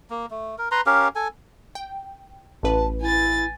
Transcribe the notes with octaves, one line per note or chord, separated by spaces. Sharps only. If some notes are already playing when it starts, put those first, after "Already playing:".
A#3
A3
A#4
B4 A#5 C6
C#4 G4 A#4 F5
A4 G#5
G5
A1 B4 A5
E4 G#5 A6